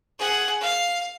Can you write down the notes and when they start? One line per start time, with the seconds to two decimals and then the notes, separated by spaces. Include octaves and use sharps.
0.19 G#4 F#5
0.61 F5